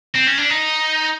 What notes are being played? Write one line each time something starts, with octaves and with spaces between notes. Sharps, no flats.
C4
C#4
D4
D#4